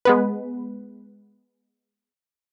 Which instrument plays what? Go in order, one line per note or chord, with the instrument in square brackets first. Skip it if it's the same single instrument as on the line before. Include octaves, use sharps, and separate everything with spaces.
[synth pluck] G#3 B3 B4